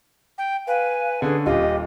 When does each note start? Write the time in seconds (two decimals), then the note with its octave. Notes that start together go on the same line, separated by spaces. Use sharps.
0.38 G5
0.67 B4 F5 G#5
1.22 D3 C#4 G#4
1.46 D#1 F4 G4 D#5